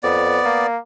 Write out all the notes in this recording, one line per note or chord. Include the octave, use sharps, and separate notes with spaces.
F2 B3 D5
A#3